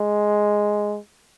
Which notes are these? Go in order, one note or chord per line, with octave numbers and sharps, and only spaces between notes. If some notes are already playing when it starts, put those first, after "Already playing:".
Already playing: G#3